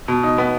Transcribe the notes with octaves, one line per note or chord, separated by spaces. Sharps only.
B2
D#4
B3